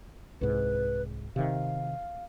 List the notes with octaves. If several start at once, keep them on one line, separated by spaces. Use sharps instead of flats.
C2 G#2 B4
C3 D#3 F5